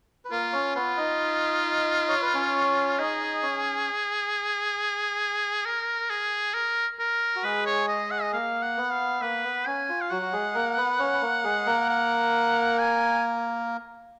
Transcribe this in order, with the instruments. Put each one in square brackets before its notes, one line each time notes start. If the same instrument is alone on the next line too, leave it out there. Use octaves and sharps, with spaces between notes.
[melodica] B4
[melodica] A#3 A#4 [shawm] F4
[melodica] C#4 C#5
[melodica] B3 B4 [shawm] F4
[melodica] D#4 D#5
C#5
B4
C#4 C#5
[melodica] D#4 D#5 [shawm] G#4
[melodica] C#4 C#5
[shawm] A#4
G#4
A#4
A#4
[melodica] F#4
[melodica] G#3 G#4 [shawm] B4
[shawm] C#5
D#5
F#5
D#5
[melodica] A#3 [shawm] F5
[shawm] F#5
[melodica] B3
[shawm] F5
[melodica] A#3 [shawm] B4
[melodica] B3
[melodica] C#4 [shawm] G#5
[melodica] F4
[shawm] F5
[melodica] F#3 F#4 [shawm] F#5
[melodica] F#4
G#3 G#4
A#3 A#4
B3 B4
C#4 C#5
B4
A#3 A#4
G#3 G#4
A#3 A#4
[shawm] F#5
G#5